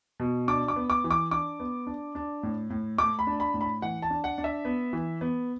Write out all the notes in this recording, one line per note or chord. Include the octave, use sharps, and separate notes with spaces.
B2
D4 D6
D6
B3
D6
E3
D6
D4 D6
B3
D4
D4
A2
A2
A3 D6
B5
D4
B5
A2
B5
E3 F#5
A5
D4
F#5
D4
E5
B3
E3
B3